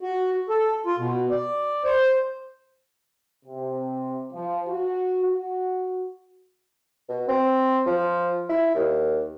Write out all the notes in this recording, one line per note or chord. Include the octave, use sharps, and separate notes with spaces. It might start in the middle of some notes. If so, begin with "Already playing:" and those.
F#4
A4
F4
B2
D5
C5
C3
F3
F#4
F#4
B2
C4
F3
E4
D#2